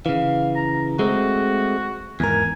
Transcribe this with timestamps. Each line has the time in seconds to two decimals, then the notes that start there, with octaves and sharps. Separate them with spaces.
0.06 C#3 E3 F5
0.56 A#5
0.99 G#3 A3 C4 F#4
2.20 E2 G#2 A#4 G#5